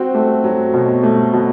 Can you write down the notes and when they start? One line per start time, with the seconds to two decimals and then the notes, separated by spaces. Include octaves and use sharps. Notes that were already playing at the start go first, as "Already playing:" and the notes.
Already playing: C4 F#4
0.15 A3
0.44 F#3
0.74 B2
1.03 A3
1.33 B2